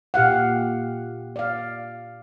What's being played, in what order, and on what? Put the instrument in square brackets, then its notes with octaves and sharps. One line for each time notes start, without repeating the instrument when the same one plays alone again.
[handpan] A#2 G4 F5 F#5
D5 F5